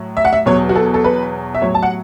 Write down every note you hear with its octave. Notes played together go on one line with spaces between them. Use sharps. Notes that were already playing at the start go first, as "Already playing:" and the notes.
Already playing: A2 F#3
E5
F#5
E5
E2 B2 F#3 C#5
F#4
A4
A4
B4
E5
A2 F#3 C#5
A5
F#5